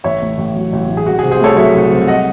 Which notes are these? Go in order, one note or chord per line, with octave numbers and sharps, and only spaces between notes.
A1 C#5 E5
A2
A1
F#3
A1
A2
G#4
C2 F#4
G#4
C3
G#4 C5
A3 A4 C#5
F#3 C#5 E5
C2
C3
D#5 F#5